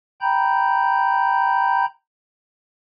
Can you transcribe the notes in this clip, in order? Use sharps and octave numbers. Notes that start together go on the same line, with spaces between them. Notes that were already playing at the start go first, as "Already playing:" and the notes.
G5 A#5 B5 G6